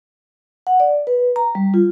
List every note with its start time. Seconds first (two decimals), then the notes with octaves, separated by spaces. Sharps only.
0.67 F#5
0.80 D5
1.07 B4
1.36 A#5
1.55 G3
1.74 F4